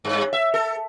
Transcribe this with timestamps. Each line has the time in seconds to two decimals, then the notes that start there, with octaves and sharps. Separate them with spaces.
0.05 G2
0.33 E5
0.54 A4